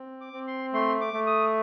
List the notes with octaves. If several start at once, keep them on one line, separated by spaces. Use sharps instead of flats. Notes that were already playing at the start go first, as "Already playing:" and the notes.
Already playing: C4
D6
C4
C6
A3 C6
D6
A3
D#6